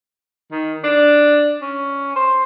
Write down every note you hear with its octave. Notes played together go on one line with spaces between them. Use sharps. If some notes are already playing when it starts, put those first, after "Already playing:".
D#3
D4
C#4
C5